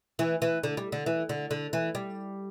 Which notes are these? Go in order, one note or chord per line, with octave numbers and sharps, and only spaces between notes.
E3
E3
D3
G3
D3
E3
D3
D3
E3
G3